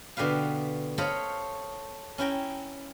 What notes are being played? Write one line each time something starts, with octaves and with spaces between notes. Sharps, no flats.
B2 D3 G4 B4 F5
A4 C5 C#5 D#5 F5 B5
C#4 E4 G5 A#5